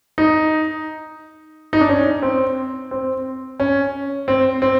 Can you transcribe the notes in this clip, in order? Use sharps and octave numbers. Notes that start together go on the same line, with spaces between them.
D#4
D#4
D4
C#4
C4
C4
C#4
C4
C4